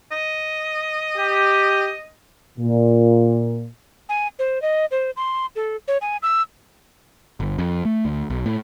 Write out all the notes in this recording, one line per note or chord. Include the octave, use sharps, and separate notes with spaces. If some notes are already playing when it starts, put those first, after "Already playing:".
D#5
G4
A#2
G#5
C5
D#5
C5
C6
A4
C#5
G#5
E6
G1
F2
A3
D2
B1
A2